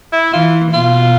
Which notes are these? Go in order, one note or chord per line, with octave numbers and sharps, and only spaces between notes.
E4
E3 F4
B2 F4